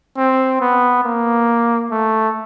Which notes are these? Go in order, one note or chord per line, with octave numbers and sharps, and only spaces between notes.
C4
B3
A#3
A3